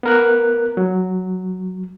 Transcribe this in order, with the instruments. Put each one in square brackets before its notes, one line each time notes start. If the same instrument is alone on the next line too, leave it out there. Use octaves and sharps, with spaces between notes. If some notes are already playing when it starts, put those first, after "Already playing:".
[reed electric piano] B3 A#4 F#6
F#3